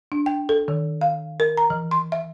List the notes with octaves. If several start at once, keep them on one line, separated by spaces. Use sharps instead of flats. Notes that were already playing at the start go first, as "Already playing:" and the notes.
D4
G5
A4
D#3
F5
A#4
A#5
E3
C6
E5